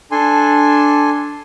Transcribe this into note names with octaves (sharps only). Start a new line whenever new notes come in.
D4 A4 G#5 C6